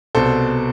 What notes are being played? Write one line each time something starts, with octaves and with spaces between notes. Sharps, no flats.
C2 B2 A4 C5